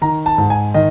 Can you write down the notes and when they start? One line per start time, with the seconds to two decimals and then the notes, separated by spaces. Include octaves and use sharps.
0.02 D#3 A#5
0.26 A5
0.38 G#2
0.50 G#5
0.74 D#3 D#5